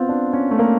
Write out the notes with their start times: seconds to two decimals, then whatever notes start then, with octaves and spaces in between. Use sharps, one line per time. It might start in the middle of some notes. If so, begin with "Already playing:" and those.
Already playing: B3 C4 F4
0.09 D4
0.33 C#4
0.51 A3
0.59 A#3